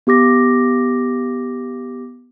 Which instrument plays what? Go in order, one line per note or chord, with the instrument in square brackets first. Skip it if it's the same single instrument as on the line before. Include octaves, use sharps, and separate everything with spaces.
[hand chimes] B3 G4 D6 A#6